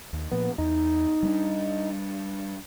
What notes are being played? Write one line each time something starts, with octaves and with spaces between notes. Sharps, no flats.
D#2
A#2 F3 B3
E2 D#4
G3 A3 D4